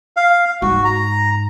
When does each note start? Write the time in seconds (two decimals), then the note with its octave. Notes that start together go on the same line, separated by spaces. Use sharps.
0.17 F5
0.62 G#2 F#4
0.85 A#5